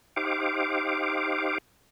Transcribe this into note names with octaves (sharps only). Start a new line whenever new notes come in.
D#4 G4 C5 F5 D6